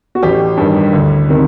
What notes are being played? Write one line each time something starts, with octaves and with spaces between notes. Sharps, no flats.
F#4
A1 G4
G2 D#3
D2
C3 D#3